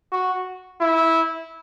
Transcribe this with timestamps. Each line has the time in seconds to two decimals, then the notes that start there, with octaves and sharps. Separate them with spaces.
0.12 F#4
0.80 E4